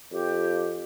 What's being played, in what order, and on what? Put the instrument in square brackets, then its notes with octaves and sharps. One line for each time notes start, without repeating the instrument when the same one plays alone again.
[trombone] F2 [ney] G4